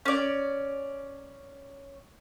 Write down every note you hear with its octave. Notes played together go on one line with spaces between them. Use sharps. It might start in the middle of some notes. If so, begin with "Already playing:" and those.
C#4 D5